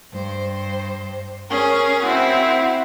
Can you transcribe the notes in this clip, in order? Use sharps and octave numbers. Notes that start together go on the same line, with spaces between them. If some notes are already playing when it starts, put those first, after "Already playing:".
G2 C5
C#4 G#4 A#4
C4 E4 F#4